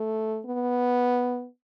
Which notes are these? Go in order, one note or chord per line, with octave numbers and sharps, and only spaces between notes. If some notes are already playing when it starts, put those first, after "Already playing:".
Already playing: A3
B3